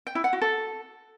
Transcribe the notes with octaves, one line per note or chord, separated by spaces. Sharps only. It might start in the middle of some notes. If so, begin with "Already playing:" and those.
G5
E4
F#5
F#4
A4